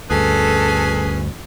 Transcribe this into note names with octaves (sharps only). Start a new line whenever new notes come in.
D2 G2 C#4 G#4 A4 B4